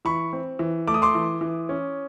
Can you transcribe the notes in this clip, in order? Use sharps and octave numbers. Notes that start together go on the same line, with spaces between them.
E3 B5 C#6
C4
E3
A3 D6
D#6
C6 D6
E3
E3
C#4